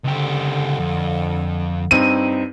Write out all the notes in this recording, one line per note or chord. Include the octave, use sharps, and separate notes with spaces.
C#2 D3 G4
F2
G2 C4 D#4 D#7